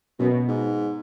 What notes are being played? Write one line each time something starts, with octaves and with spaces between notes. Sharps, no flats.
F#2 B2
G#2